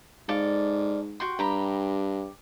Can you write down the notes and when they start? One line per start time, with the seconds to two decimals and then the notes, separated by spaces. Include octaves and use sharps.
0.29 G#2 A4 D5 F5
1.20 F#4 G5 C6
1.39 G2 G4 A#5 B5